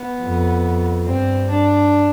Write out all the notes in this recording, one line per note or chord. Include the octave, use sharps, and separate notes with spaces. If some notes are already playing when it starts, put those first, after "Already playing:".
Already playing: B3
F2
G2 C4
D4